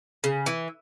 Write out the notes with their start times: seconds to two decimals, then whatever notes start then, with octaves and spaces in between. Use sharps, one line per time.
0.24 C#3
0.46 E3